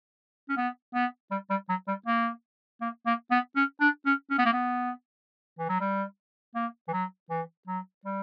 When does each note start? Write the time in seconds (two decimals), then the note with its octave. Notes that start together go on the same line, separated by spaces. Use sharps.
0.49 C#4
0.57 B3
0.94 B3
1.31 G3
1.50 G3
1.69 F#3
1.88 G3
2.06 A#3
2.81 A#3
3.06 A#3
3.31 B3
3.56 C#4
3.81 D4
4.06 C#4
4.30 C#4
4.38 B3
4.46 A#3
4.53 B3
5.59 E3
5.69 F#3
5.81 G3
6.55 A#3
6.88 E3
6.93 F#3
7.30 E3
7.67 F#3
8.05 G3